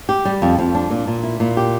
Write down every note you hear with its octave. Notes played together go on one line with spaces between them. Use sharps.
G4
G3
F2
F2
D4
A#2
A#2
E4
A#2
G4